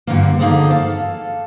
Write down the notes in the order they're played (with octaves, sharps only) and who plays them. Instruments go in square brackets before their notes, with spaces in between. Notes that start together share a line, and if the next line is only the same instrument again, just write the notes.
[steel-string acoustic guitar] G2 B2 D3 F#3 A#3
D3 A#3 D#4 G#4 A4 C5
A4 F5 A5